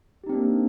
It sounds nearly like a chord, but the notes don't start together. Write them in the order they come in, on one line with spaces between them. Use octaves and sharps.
G4 D#4 C4 D4 A#3